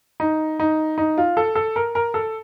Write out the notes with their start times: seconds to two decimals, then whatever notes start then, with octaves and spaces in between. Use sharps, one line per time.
0.20 D#4
0.60 D#4
0.98 D#4
1.18 F4
1.37 A4
1.55 A4
1.76 A#4
1.95 A#4
2.14 A4